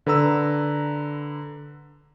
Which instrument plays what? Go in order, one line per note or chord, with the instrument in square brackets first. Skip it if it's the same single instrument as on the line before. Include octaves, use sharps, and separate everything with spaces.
[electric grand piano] D3 B4 A#5 E6